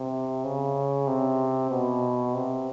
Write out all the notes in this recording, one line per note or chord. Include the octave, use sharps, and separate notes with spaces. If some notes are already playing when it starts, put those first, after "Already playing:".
Already playing: C3
C#3
C3
B2
C3